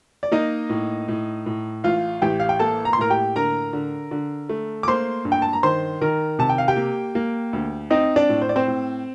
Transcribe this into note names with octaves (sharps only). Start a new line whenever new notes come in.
D5
A#3 D#4 D#5
A2
A2
A2
A1 F4 F5
A1 G4 G5
F5
G5
A#3 A4 A5
A#5
C6
A2 A#4 A#5
G4 G5
D3 A#4 A#5
D3
D3
A3
D6
A#3 C5 C6
G2
G5
A5
A#5
D#3 C5 C6
D#3 A#4 A#5
C3 A5
G5
F5
G4 G5
A#3
A#3
D2
C4 D#4 D#5
D4 D5
A2
C5
D5
C4 C5
A2